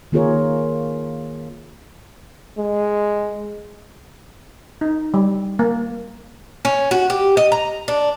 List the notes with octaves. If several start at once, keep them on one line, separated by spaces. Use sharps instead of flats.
D#3 A#3 F4 G#4 A#4 C#5
G#3
D#4
G3
A#3
C#4
F#4
G4
D#5
A#5
D4